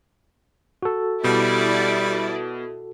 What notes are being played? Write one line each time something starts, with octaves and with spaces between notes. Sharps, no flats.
F#4 A4
B2 G3 E4 D5